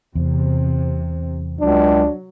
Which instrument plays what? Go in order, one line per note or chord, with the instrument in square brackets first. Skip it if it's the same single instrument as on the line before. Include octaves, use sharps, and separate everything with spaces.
[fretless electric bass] E2 [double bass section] C3
[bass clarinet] C#2 [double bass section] F#3 [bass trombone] D4